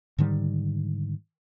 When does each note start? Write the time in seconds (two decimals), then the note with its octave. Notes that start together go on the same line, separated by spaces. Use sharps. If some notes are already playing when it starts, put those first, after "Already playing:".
0.18 G#2 D3 D#3 G3